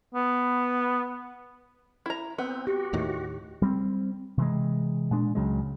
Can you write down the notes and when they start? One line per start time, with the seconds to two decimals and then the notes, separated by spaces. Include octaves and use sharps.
0.14 B3
2.06 E4 A#5
2.38 B3 C4
2.67 F#4 G4
2.93 D#2 A2 D#3
3.62 G3 A#3 C4
4.38 C3 E3 G#3
5.11 A#2 G#3 D4
5.35 C#2 C#3 F#3 G#3